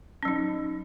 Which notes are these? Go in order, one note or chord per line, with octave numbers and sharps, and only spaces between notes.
F#3 C#4 D#4